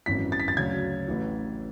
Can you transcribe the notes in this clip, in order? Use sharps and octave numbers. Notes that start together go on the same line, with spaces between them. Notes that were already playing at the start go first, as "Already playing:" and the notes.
G#1 F#2 E3 B6
A6
B6
A6
D2 C#3 F#3 G#6
A1 A2 E3